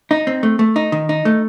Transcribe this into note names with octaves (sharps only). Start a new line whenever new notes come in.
D#4
C4
A3
A3
D#4
D#3
D#4
A3